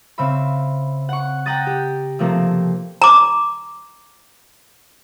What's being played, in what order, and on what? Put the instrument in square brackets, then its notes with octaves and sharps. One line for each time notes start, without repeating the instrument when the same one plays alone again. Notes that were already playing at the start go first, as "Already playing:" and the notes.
[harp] C#3 C4 E5 B5
F#5 C#6
F#5 G5 A#5 D#6 A6
G4
C3 F3 A3 A#3 C4
[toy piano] A#5 D6